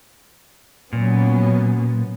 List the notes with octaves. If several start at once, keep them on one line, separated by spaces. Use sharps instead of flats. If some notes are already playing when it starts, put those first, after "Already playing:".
A#2 F#3 B3 C#4